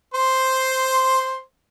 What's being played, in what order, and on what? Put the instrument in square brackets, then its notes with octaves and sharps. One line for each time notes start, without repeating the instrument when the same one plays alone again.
[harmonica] C5 C6